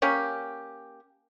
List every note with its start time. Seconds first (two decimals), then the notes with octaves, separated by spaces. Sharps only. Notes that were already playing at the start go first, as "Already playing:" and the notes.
0.02 A#3 C#4 G4